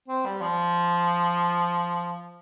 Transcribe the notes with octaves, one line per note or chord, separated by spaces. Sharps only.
C4
G3
F3